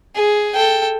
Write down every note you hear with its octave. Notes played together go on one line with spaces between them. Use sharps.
G#4
A4 G5